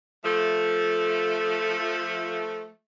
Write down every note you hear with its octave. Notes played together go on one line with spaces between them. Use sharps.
F3 A3